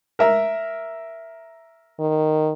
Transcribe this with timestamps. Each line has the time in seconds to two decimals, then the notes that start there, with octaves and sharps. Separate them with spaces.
0.19 A#4 E5 A#5
2.00 D#3